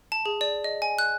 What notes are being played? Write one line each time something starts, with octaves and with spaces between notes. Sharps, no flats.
A5
G#4
D5
D#5
G#5
F#6